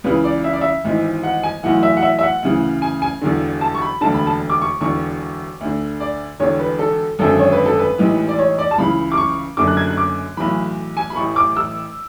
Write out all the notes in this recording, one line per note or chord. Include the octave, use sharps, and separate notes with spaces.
C#2 C#3 E3 B4
D5
E5
D5
E5
G#1 G#2 E3
F#5
G#5
B1 A2 E3 F#5
E5
F#5
E5
E5
F#5
D2 C#3 E3
G#5
G#5
E1 E2 D3
A5
C#6
B5
E1 D2 D3 A5
B5
A5
D6
C#6
E1 E2 D3 C#6
D2 D3
D5
E1 E2 D3 C#5
B4
A4
G#1 F#2 D3 A4
C#5
B4
A4
B4
A1 G#2 E3
D5
C#5
D5
A5
C#2 C#3 E3 B5
D6
C#6
F#1 F#2 D3 D6
F#6
G#6
F#6
D6
B1 A2 E3 B5
G#5
B5
A1 A2 E3 C#6
D6
E6